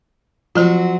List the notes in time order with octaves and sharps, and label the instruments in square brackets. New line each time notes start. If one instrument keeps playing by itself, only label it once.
[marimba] F3 F4 [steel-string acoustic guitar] F#3 C4 F#4